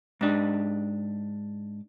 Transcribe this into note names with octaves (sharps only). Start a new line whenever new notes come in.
G#2 D4